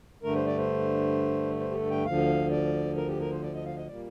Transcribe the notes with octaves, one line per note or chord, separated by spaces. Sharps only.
G2 D3 A3 A#4
C5
D5
C5
C5
G4
A4
G5
D2 D3 F3 F5
D5
A#4
G4
A#4
C5
D5
D#5
F5
D#5
A#2 G3 A#3 D5